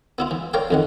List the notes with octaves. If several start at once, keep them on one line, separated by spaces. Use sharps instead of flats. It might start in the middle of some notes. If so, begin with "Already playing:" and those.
B3 E4 F4
E3
A#4 C#5 D5 F5 G5
F2 D#3 F#5